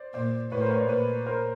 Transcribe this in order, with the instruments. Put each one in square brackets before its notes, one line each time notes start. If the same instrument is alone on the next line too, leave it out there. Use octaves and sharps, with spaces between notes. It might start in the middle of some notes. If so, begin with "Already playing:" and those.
Already playing: [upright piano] C5 D5
[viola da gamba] A#2 [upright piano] C5 D5
[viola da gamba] A2 [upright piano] B4 C#5
[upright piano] A#4 C5
B4 C#5
C5 D5
[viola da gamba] A#2 [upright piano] B4 C#5
[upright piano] A#4 C5